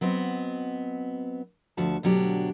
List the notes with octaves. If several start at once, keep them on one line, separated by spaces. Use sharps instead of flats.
F#3 B3 C4 D#5
D2 F3 F#4 A5
D2 B2 F#3 D4 G4